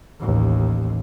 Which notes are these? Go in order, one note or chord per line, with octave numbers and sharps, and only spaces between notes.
A1 D#2